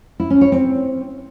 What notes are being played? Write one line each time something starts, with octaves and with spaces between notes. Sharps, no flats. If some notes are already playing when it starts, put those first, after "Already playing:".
E4
C#4
C#5
C4